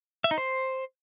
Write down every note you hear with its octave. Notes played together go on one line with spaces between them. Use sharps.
E5
D#4
C5